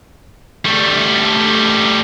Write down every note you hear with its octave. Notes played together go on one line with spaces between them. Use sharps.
G3 A3